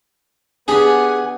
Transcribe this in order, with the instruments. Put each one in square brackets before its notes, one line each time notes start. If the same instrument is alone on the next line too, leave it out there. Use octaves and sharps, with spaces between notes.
[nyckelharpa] B3 F#5 [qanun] D4 G4 B5 [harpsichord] G#4 [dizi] G#5